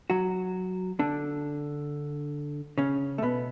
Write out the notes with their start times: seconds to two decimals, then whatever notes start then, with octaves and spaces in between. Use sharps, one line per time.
0.10 F#3 F#4
0.99 D3 D4
2.78 C#3 C#4
3.18 A3
3.22 B2 B3